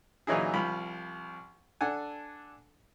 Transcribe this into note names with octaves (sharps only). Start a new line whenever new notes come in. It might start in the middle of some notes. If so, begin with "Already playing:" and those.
A#2 E3 F#3 D#4 E4 G#4
C2 F3 B5
D4 A4 F#5 G#5